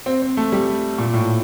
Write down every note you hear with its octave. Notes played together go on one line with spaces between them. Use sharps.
C4
C4
A3
G3
A#2
A2